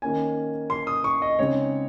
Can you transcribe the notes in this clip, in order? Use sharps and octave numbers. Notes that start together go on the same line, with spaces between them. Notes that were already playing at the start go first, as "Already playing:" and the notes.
D#3 A#3 C#4 G#5
C6
D#6
C#6
D#5
C#3 G#3 C4 D#4 C#5